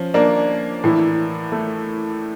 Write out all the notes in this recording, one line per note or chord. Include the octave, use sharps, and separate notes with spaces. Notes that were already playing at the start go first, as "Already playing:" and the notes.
Already playing: F3 C#4
A#3 D4
A2 E3
A3